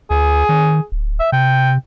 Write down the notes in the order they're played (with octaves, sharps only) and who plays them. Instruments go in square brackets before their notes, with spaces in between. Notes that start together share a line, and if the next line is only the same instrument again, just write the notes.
[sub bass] D2 [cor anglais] G#4
[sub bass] D#3
D1
[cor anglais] E5
[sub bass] C3 [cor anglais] G5